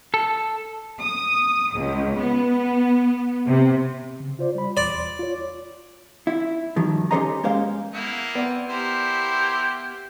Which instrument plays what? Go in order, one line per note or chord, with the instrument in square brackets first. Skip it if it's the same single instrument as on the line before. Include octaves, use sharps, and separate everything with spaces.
[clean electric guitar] A4
[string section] D#6
C#2
B3
C3
[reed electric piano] C#3
F4 C5 D5
G3 B5
[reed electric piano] E2 C6 [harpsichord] D5
[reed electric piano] F4 C#5
[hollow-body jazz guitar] E4
G2 D#3 F3 F#3
C#4 G4 A4 C5 D#5 A#5
F#2 G#3 A#3 C5 F5
[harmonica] A#3 E4 [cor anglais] B3
[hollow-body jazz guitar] B3 D5 [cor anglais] C4
[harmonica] E4 A#4 C5 [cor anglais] G4